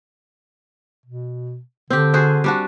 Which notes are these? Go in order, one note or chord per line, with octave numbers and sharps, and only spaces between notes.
B2
D3 C4 G4
F#4 G#4 C5
G3 D4 F#4